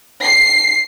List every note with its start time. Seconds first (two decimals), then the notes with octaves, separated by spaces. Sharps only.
0.24 C7